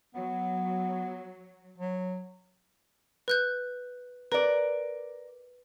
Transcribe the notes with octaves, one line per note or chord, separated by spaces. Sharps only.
F#3 B3
F#3
B4 F#6 G6
A#4 B4 D5